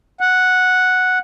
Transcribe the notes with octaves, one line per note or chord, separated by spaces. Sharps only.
F#5